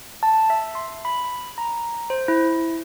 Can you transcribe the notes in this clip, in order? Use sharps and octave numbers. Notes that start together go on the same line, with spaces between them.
A5
E5
C6
B5
A#5
C5
E4